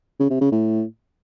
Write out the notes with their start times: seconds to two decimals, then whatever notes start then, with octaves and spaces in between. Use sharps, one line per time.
0.19 C#3
0.30 C3
0.41 C#3
0.52 A2